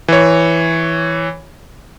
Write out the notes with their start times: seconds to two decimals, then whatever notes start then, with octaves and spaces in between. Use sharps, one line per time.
0.08 E3 C#5